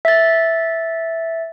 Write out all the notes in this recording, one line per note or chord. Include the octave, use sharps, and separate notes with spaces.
E5 A6